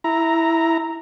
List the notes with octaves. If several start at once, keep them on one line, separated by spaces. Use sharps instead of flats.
E4 A#5